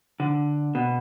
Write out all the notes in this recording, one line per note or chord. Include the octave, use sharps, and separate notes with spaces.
D3
B2